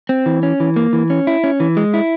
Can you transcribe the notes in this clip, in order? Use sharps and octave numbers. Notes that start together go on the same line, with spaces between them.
C4
E3
C#4
E3
A#3
E3
C#4
E4
C#4
E3
G#3
E4